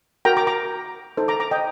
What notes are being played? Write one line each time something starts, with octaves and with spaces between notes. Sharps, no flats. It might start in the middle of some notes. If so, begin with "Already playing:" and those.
F#4 A#4 G5 A#5
A#5 D6
A#5 D6
D#4 A4 C5
A#5 D6
A#5 D6
D#5 G5